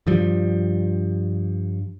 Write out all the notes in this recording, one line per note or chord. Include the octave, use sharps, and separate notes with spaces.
G2 F3 G3